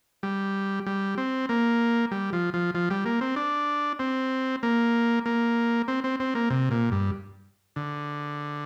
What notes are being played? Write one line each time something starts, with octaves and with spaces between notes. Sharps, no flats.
G3
G3
C4
A#3
G3
F3
F3
F3
G3
A#3
C4
D4
C4
A#3
A#3
C4
C4
C4
A#3
C3
A#2
G2
D3